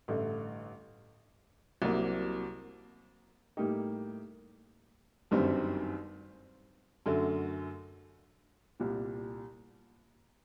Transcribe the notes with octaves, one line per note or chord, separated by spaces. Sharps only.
A1 G2 D3 A3
C2 C3 F#3 A#3
A2 G3 A#3 D#4 G4
G1 F#2 D#3 G3 C4
F#2 D3 F#3 A3
C2 A#2 G3